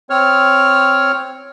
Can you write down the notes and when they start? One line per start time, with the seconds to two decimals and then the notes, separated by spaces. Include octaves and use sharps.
0.10 C4 C#5 F6